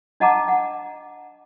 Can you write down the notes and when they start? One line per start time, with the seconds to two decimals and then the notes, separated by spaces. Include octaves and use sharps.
0.20 D4 D#5 F#5 A5 A#5 D6
0.48 F#5